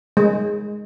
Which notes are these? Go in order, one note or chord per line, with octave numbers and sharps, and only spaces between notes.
G#3